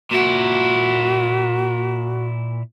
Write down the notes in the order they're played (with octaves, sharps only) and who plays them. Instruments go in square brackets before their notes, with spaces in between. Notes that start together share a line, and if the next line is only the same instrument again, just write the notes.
[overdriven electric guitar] A#2 E4 [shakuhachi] F#4